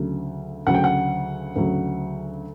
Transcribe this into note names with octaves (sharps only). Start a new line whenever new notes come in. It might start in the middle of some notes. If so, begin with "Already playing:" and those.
Already playing: D2 C#3 F#3
D2 C#3 F#3 F#5
G5
F#5
D2 C#3 F#3